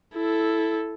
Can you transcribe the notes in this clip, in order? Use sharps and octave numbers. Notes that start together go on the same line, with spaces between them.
E4 A4